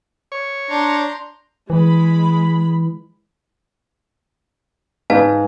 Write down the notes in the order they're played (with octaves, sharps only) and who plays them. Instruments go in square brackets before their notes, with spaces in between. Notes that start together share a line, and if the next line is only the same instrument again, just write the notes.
[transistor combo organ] C#5
[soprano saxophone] D4 [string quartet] A#5 C6 G6
[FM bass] E3 [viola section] G#3 B5
[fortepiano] G#2 [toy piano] B4 F5 A5